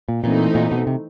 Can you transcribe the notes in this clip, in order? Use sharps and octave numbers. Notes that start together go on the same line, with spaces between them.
A#2
A#2 E3 A3 C4 D#4
A#2
B2
C3